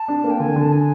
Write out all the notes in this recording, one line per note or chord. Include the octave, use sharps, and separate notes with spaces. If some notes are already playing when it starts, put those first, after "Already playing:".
Already playing: A5
D4
A#3
G5
D3 G#5
D3 A5
G#5